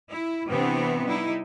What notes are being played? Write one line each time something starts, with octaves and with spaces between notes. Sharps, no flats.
E4
C3 E3 B3 C4 D4
G3 D#4 E4